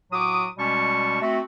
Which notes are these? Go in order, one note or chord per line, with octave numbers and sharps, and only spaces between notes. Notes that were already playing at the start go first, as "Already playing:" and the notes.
A2 F#3 F#4 D6 D#6
B2 G3 G#3 C#4 A5 C#6
A3 C4 F#4